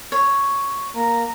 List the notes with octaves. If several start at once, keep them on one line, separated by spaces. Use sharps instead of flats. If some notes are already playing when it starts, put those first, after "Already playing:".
C#5
A#3 A#5